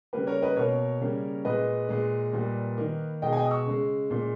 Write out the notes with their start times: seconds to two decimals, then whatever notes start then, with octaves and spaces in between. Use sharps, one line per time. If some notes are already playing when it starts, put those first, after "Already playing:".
0.13 C#3 G3 A#3 B4
0.27 A#4 C#5
0.42 B4 D#5
0.56 B2 A#3 A#4 C#5
1.01 C#3 G3 A#3
1.45 A#2 G#3 B4 D#5
1.89 A#2 G#3
2.33 A#2 G3 A#3
2.77 D#3 A#3
3.22 B2 G#3 D#5 G5
3.33 G#5
3.36 D#5 G5
3.45 D#6
3.51 C#6 E6
3.66 C#3 G#3
4.10 A#2 G#3